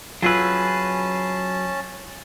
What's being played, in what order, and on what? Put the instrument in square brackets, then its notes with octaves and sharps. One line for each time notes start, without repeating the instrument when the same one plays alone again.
[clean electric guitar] F#3 G#4 B4 [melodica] C#4 A5 [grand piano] F4 E6